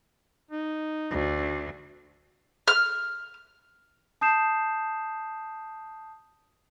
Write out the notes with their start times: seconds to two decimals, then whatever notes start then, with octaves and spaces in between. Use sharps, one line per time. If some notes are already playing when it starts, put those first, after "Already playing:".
0.51 D#4
1.11 D2
2.68 F6
4.21 A5 D#6 G6 C7 E7